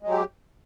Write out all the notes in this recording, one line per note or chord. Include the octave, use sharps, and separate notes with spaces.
F#3 G#3 G4